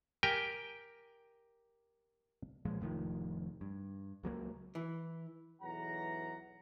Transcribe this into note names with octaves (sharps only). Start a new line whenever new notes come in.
G4 A#4 G5 G#5
A#2 F3 G#3
F1 A2 D#3 F3
G2
C#2 F#3 G#3 A#3
E3
B1 E2 E3 F#3 F#5 A#5